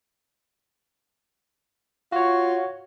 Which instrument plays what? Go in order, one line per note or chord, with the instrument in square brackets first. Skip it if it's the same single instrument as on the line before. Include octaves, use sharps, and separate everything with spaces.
[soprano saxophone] F4 [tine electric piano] F#4 C#5